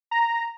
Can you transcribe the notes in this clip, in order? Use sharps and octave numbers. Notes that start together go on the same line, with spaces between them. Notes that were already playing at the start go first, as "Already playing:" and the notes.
A#5